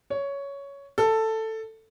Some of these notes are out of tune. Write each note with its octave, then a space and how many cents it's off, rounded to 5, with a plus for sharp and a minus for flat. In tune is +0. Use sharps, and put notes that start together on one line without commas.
C#5 +10
A4 +10